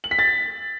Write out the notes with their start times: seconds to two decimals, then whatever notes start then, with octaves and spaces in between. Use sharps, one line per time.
0.04 F#7
0.11 B6
0.19 A6